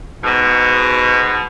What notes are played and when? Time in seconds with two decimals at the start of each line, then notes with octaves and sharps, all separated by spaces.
0.24 G#2 B2